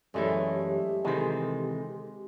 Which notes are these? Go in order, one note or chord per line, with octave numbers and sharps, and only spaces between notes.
F#2 E3 G#3 A3 E4 G4 C#5 D5
C3 D#3 E3 G#3 C4 A4 C5